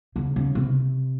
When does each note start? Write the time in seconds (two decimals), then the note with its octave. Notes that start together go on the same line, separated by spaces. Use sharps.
0.16 C#3
0.36 C#3
0.55 C3